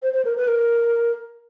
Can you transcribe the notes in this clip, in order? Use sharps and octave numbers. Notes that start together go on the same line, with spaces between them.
C5
C5
A#4
B4
A#4